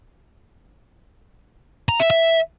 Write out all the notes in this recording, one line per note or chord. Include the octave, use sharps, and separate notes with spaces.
A#5
E5
E5